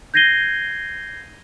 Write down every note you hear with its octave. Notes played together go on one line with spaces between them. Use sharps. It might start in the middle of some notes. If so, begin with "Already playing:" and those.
G6 G#6 A#6 C7 D#7 G7